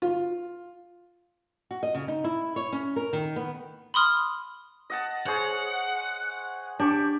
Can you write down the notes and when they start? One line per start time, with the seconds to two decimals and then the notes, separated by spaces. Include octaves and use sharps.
0.02 F4
1.71 F#4
1.83 D#5
1.95 C#3
2.08 D#4
2.24 E4
2.56 C#5
2.72 C#4
2.96 A#4
3.13 D#3
3.36 B3
3.94 B5 C6 D#6 F6
4.90 D#5 F#5 A5
5.26 G#4 C5 C#5 F#5
6.80 D4 G4 C#6